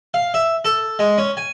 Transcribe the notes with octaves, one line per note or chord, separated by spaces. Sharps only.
F5
E5
A4
G#3
C#4
G#5